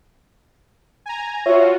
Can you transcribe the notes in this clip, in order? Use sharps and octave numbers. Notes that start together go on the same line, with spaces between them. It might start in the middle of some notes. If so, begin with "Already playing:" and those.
G#5 A#5
F4 F#4 C#5 E5